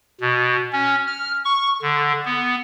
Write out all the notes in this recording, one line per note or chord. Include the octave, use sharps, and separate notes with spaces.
B2
C#4
F6
C#6
D3
B3